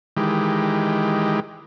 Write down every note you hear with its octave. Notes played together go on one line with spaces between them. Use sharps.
D#3 E3 G#3 G4